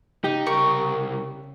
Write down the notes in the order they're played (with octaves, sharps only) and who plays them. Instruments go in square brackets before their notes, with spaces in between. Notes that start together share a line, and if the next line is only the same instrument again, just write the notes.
[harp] C#3 [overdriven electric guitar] D#4 [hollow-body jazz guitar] G4
[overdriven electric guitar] C2 A#4 [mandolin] C#6